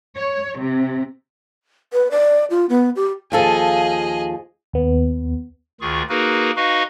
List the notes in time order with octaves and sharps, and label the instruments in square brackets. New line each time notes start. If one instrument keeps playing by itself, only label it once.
[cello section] C#5
C3
[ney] B4
D5
F4
B3
G4
[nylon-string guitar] D#2 F3 A4 [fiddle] G#4 D#5
[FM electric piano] D#2 B3
[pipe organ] D2 D#3 F4 G#4 C#6
A#3 D#4 F#4 G#4 A#4 B4
D#4 F#4 B4 D#5 F5 C#6